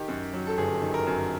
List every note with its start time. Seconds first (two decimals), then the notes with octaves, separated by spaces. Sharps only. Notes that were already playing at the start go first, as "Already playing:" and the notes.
Already playing: D#3 G4
0.08 F#2
0.33 F#3
0.47 A4
0.58 G1 G#4
0.82 D#3
0.94 A#4
1.07 F#2